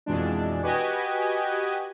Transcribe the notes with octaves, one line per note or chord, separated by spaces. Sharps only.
F2 B2 E3 G#3 D4
F#4 G4 B4 D#5 G#5